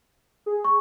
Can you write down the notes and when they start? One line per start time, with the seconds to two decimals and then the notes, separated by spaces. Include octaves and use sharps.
0.46 G#4
0.65 C#6